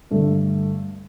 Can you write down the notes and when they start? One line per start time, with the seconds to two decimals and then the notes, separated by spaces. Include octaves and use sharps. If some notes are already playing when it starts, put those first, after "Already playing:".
0.11 G2 D3 A3